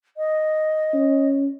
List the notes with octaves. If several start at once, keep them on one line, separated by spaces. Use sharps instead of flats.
D#5
C#4